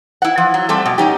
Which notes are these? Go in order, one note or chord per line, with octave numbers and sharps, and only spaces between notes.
E4 F#5
F3
F#3
G3 A3 C4 A4
B2
C#4 D#4 G4